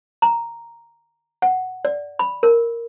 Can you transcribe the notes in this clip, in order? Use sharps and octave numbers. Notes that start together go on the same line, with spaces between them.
A#5
F#5
D5
B5
A#4